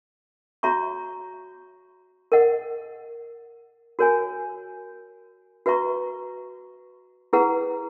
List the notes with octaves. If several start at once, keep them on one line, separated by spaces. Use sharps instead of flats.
F#4 C#5 E5 A#5 C#6
A#4 D#5 F#5
F#4 A#4 C#5 G#5
F#4 B4 E5 A#5 C#6
E4 G#4 B4 F#5 A#5